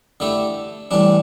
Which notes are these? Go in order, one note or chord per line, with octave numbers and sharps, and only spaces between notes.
D3 A3 E4 G4
A2 E3 G3 D4